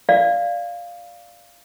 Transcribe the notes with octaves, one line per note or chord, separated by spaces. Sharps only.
D5 F5